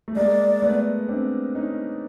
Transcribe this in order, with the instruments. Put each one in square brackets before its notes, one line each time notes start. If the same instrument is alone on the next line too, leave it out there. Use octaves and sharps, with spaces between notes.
[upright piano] A3
[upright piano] G#3 A#3 [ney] D5
[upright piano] A3 B3
C4 D4
C#4 D#4